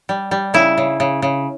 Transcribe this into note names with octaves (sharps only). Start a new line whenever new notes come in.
G3
G3
C#3 E4
C#3
C#3
C#3